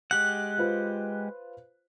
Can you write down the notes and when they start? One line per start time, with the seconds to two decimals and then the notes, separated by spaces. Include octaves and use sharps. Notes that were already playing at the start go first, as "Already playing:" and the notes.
0.11 G#3 G4 F#5 F#6
0.58 F4 B4 C5